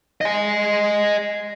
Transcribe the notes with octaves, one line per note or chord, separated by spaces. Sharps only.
D#5 G#5